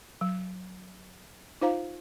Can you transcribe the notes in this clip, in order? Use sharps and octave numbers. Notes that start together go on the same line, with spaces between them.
F#3
D#4 F4 C5 F5 A#5